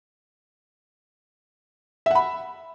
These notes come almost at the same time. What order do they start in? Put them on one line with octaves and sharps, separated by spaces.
E5 F#5 B5